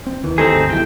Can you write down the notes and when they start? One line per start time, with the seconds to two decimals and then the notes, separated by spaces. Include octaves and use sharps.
0.06 C4
0.24 D#2 D#3 E3
0.38 G3 C4 D#4 G#4 A4 C5
0.54 G1 D2
0.70 E2 C3 D#3 G#3 E4 G5